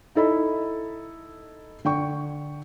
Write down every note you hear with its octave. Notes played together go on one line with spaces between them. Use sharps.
D#4 E4 A4 D#5 B5
D3 G5 C#6